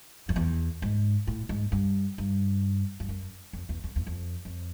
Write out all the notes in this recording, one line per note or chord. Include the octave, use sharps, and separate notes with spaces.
F2
E2
G#2
A2
G#2
G2
G2
G2
F#2
F2
E2
F2
E2
F2
F2